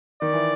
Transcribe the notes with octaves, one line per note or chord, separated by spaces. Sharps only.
D#3 D5
E3